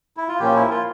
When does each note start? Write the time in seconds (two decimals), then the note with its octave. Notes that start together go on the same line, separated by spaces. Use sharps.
0.17 E4
0.28 F4
0.39 A#2 F3 A#3 C#4 G4
0.56 E4
0.70 F4